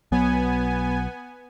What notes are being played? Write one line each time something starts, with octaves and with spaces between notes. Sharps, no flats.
B1 B2 F#3 B3 G#5